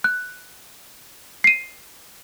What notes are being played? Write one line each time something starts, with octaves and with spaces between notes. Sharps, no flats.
F#6
C7 D#7